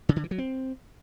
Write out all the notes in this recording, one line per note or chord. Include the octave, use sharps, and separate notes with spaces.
C#3
D3
E3
F#3
C4